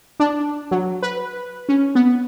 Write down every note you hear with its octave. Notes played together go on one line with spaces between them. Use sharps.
D4
F#3
B4
C#4
B3